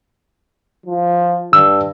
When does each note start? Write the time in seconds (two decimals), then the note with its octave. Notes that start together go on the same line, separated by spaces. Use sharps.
0.86 F3
1.53 G2 E6